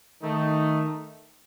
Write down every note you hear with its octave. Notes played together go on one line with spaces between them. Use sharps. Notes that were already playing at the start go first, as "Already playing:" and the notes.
D#3 A3 D#4